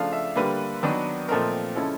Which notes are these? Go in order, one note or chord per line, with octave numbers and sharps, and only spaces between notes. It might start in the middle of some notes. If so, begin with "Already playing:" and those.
Already playing: C#3 F3 A3 D4 F5
E5
D3 G3 A#3 B4
D#3 F#3 B3 D4
A#2 F3 A3 C4 D#4 A#4
C#3 F3 G#3 C#4 E4 A4